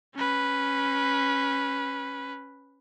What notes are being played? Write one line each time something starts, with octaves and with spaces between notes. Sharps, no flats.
C#4 B4